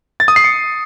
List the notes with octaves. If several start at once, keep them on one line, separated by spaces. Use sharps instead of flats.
A6
D#6
C7
C#7